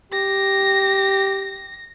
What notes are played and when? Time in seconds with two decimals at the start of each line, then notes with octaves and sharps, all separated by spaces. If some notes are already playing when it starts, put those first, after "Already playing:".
0.12 G4 A#6